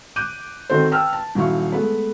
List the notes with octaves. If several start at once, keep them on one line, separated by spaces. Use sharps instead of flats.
D6 F#6 G6 D#7
D#3 C4 F#4 A4 C5
B4 G5 A5 E6 F6
A5
D#1 F#3 E4 F5 C#6
G#3 A3 B3 B4